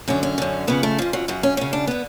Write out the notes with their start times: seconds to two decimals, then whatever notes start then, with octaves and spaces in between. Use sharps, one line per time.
0.08 F#2 D3 C#4
0.23 C#4
0.38 F#2 D3
0.67 F2 C#3 B3
0.83 A3
0.98 F2 C#3 F3
1.13 F#3
1.28 F#2 C#3 F#3
1.43 C#4
1.57 F#2 C#3 C#4
1.73 D4
1.87 D3 B3